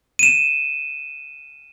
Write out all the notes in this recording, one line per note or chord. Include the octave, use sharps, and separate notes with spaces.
D#7 E7